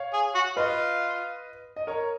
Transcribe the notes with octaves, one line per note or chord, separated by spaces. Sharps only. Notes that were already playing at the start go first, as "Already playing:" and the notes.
Already playing: C#5 F5
G#4
F#4
F4 B4 D#5
D#5
A#4 C#5